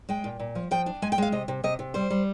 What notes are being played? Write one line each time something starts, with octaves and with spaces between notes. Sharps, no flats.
G#3 G5
A#2
A#2
F3
F3 G5
D4
G#3 G#5
G5
G#3 F5
C3 D#5
C3
C3 D#5
C3
G3 C5
G3